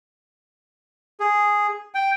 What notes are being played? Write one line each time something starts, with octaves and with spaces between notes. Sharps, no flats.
G#4
G5